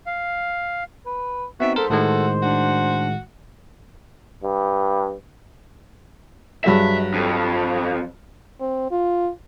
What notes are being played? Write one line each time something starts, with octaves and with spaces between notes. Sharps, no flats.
F5
B4
B3 C4 D#4 F#4 E5
G#2 A4 A#4 C5
A2 D#3 G#3 F#4 A4
D4 F#4
G2
G2 F#3 G#4 E5
F2
C4
F4